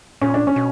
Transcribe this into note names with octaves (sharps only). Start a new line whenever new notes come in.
A#2 C#4
D4
C#4
B2